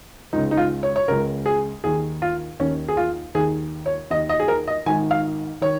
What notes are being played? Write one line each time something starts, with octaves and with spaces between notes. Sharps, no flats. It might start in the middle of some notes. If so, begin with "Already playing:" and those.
C#2 C#3 D#4
D#4
F4
C#5
C#5
C#2 C#3 A#4
G#4
D#2 D#3 G#4
F4
D#2 D#3 C#4
G#4
F4
D#2 D#3 G#4
C#5
D#2 D#3 D#5
D#5
G#4
A#4
D#5
G#1 G#2 D#3 G#5
F5
D#3 C#5